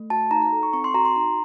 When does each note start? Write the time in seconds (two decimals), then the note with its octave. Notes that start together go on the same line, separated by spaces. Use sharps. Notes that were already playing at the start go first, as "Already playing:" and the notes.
Already playing: A3
0.10 F#4 A5
0.31 D#4 A#5
0.42 A#5
0.52 A4
0.63 C#6
0.73 C4 C#6
0.84 C6
0.94 F#4 A#5
1.05 C6
1.16 D#4 A#5